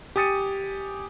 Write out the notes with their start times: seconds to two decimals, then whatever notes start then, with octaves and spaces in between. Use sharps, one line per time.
0.16 G4 G#5 D#6 A6 C#7 D#7